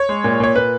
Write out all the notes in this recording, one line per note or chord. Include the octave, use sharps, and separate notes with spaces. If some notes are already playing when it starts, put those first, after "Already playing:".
Already playing: C#5
G#3
A#2
A#2 C#5
A#2 B4